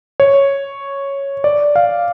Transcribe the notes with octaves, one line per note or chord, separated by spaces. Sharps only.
C#5
D5
F5